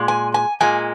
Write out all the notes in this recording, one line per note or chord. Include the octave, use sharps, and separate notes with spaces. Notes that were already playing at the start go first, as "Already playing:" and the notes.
Already playing: A#2 G#3
G#5
G#5
A#2 G#3 G#5